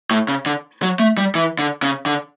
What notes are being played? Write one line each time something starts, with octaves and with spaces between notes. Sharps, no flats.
A2
C#3
D3
F#3
A3
G3
E3
D3
C#3
D3